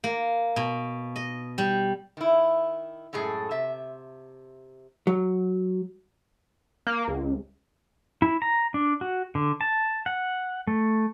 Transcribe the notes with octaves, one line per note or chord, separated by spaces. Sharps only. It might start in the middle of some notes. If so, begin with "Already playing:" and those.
A#3
B2
D#5
G3
D#3 E4
F#2 A2 G#3 G#4 A4
C3 E5
F#3
A#3
C#2
E4
A#5
D4
F#4
D3
A5
F#5
A3